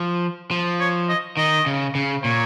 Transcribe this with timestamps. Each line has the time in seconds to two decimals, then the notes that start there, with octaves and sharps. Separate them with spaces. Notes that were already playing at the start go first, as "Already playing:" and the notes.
Already playing: F3
0.51 F3
0.81 C#5
1.09 D#5
1.37 D#3 D#5
1.66 C#3
1.95 C#3
2.24 A#2 C#5